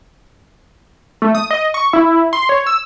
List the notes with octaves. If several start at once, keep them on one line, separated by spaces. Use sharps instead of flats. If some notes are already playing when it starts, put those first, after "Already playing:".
A3
D#6
D#5
C#6
E4
C6
C#5
E6